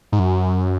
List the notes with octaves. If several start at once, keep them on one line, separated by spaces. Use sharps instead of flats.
G#2
F#2